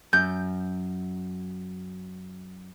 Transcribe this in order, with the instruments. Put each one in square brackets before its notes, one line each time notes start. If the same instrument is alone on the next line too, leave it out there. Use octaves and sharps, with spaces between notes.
[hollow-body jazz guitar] F#2 [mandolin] G6